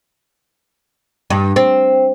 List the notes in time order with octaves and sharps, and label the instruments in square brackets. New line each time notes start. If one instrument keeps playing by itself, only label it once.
[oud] G2
C4